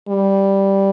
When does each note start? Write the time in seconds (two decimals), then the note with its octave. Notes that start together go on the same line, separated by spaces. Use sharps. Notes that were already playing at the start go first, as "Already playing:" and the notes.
0.09 G3